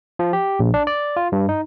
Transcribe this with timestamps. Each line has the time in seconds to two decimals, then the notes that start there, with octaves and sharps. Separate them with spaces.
0.19 F3
0.33 G4
0.59 A#1
0.74 D4
0.87 D5
1.17 F4
1.32 G2
1.49 D#4